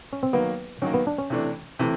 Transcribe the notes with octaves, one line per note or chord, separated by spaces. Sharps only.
C#4
C4
D#3 F#3 A#3 B3
D#3 F#3 A#3 C#4
B3
D4
C#4
C3 E3 A3 D4
C3 E3 A3